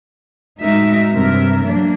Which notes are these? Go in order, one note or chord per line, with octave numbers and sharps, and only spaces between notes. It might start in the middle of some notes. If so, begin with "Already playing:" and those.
A2 G#3 D#4 F#4 A#4 E5
G2 C3 E3 A#4 E5
F3 F#3 A#3 D4